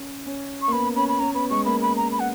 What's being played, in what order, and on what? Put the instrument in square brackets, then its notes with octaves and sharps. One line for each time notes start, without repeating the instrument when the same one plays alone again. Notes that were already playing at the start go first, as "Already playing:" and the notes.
Already playing: [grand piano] C#4
C#4
[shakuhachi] C#6
[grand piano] A#3
[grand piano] B3 [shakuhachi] B5
[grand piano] C#4 [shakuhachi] B5
[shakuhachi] B5
[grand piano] C#4 [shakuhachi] A#5
[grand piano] B3 [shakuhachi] B5
[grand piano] G#3 [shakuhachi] C#6
[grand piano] A#3 [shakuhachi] B5
[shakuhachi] B5
A#5
B5
F#5